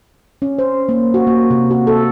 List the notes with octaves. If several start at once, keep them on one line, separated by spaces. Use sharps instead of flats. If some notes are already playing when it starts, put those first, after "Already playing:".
C#4
C5
A#3
F#4
A#3
C3
F#4
A4